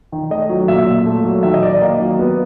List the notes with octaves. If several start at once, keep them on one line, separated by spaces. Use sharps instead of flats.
D#3
A3 D#5
F#3
A#2 E5
A#2
A3
F#3
D#3 E5
D#5
D#3 D5
D#5
A#3
F#3
B3